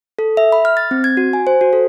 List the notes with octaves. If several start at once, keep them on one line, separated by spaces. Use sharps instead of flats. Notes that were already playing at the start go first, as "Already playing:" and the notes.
A4
E5
B5
F6
A6
C4
G#6
F#4
G#5
C5
F#4
A4